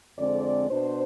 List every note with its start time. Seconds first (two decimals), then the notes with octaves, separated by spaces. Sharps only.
0.18 F2 D3 G#3 C4 D5
0.69 B2 B3 D4 C5